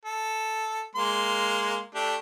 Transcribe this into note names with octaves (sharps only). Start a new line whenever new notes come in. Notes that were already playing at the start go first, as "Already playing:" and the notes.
A4
G#3 A#3 C6
A3 D4 G4